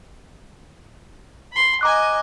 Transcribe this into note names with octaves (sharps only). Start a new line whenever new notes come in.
B5 C6
D#5 G#5 A#5 D6 F#6